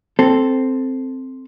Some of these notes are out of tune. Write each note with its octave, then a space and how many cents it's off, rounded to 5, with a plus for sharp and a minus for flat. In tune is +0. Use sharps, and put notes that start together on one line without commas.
C4 +0 A4 +0